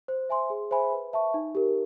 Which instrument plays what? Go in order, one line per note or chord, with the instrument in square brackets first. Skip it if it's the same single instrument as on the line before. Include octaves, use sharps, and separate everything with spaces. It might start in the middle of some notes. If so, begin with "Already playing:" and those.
[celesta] C5
E5 G#5 C6
G#4
C5 E5 G#5 B5
B4
E5 A5 C#6
D#4
G4 A#4